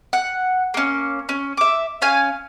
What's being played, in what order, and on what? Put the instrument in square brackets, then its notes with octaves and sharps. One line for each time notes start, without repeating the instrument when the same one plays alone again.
[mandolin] F#5
A#3 C#4
C#4
E5 D6
C#4 F5 G#5